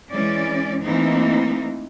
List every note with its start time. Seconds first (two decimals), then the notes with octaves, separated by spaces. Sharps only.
0.11 E3 G#3 C#4 D5
0.82 E3 A3 A#3 C4 D#4